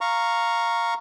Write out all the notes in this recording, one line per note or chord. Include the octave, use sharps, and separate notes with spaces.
F5 A#5 C#6